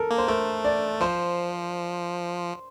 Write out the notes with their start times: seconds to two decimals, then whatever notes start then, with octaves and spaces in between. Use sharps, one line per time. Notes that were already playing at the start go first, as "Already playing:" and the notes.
Already playing: A4 A#4
0.11 A#3
0.18 C5
0.28 A3 A#4
0.65 D5
1.01 F3 C5